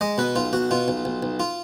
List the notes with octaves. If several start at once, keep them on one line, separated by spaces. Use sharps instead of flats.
G#3 D#5
B2 B4
B1 F4
B1 F#4
B2 F4
B1
B1
B1
F4